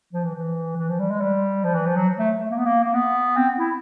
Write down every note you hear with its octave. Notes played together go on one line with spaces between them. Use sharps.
F3
E3
E3
E3
F3
G3
G#3
G3
F3
E3
F3
F#3
A3
A3
A#3
B3
A#3
A#3
B3
C4
E4